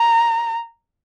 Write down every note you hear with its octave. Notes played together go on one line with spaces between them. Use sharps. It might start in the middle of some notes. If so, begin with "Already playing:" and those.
Already playing: A#5